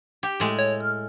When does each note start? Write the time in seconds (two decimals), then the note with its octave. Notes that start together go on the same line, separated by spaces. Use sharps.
0.23 G4
0.40 A2 G#3
0.59 C#5
0.81 F6